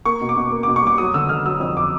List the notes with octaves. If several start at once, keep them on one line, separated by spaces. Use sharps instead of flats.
A#3 C#6
B2
D6
B2
A#3
B2 D6
C#6
G3 D6
F#3 D#6
D3 E6
D3 F6
F#3 E6
F2 D#6
D6